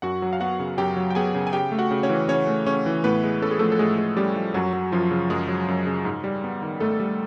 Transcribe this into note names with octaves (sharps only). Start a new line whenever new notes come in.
F#2 F#4 F#5
F#3
F5
B3 F#4 F#5
C#3
F#2 G4 G5
F#3
G5
B3 G#4 G#5
C#3
G#5
C#3 G4 G5
A3
F#4 F#5
C#3
C#4 C#5
E3
C#3 C#4 C#5
A3
C#3 C#4 C#5
E3
A2 B3 B4
G#3
C#4 A4
G#4
F3 A3 A4
A4
A2 G#3 G#4
G#3
G3 C#4 G4
F3
F#2 F#3 F#4
F#3
F#2 F3 F4
C#3
F#2 G#3 G#4
F#3
F#2
C#3
G#2
G3
B3
D#3
G#2 A3 A4
G3